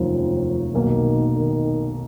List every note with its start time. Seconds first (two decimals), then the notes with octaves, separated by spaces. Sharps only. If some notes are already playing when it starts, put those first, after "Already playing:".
Already playing: F1 D#2 D#3 F3 F#3 C#4
0.74 B1 B2 D#3 A#3
1.35 D#3